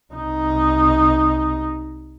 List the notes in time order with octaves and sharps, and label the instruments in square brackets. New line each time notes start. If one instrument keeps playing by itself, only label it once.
[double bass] C2 D#4